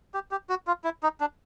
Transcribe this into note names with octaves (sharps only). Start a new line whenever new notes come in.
G4
G4
F#4
F4
E4
D#4
D4